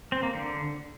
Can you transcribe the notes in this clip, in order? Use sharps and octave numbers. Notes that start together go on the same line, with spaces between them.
C4
A#3
D3